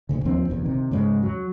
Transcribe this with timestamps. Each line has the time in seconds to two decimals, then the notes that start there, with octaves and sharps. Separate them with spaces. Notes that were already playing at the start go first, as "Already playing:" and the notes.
0.09 E1 D2 C#3
0.25 D#2 F3 C4 D4
0.50 F1 E2
0.64 C3 D#3
0.91 E2 G#2 C#3 G#3
1.23 F#3